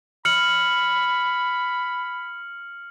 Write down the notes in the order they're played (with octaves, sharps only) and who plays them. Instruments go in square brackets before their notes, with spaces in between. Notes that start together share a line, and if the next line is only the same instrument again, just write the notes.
[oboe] B5 [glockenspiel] F6 C#7 F#7